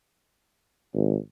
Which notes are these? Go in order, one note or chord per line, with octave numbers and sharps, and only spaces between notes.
G#1